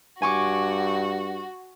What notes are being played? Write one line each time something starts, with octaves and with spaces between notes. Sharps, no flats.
G2 F#4 G#5 C#6 D6